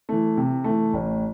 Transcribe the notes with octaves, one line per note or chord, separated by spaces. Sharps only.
E3 A3
C3
E3 A3
A1